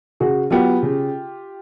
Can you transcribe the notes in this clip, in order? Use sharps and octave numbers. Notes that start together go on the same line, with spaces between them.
C#3 F#4 G#4
F#3 B3 F4 G4
C#3